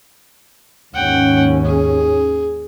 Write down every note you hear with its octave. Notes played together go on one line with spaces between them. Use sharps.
D#2 G#2 C#4 F#5 G5
G#4